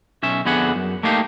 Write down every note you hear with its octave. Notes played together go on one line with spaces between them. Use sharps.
B1 C#4 E5
F2 D3 B3 G#4 E5 F#5
F#2
A3 A#3 D#4 G4 F5